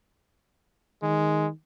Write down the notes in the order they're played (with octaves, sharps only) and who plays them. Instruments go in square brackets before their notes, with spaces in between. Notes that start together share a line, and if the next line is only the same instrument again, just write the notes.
[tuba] D#3 [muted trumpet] G#3